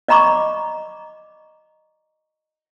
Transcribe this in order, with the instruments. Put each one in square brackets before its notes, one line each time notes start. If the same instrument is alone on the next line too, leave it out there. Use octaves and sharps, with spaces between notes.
[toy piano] D5 D#5 A#5 B5 C#6 D6